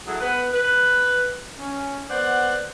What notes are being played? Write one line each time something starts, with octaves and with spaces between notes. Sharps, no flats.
F#3 E4 G#4 A4
B3 B4
B4
C#4
B3 C5 D5 F#5